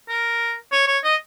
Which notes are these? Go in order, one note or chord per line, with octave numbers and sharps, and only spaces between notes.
A#4
C#5
C#5
D#5